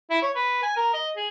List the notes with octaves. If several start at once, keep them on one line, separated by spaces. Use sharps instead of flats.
E4
C#5
B4
G#5
A#4
D#5
G#4